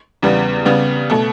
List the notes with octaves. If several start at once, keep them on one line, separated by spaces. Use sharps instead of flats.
E2 C#3 G3 B3
C#3 G3 B3
B2 A3